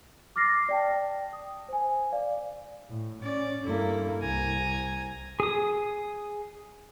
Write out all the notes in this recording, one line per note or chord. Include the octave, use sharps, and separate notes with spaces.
D6 F6 A6 A#6 C7
D5 G5 A5
D#6
C5 G#5
D5 F5
A2
C#4 D5
G2 A#3 E4 A4
C2 G#5 A#5
G#4 D#6